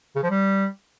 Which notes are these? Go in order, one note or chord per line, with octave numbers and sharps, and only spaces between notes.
C#3
F3
G3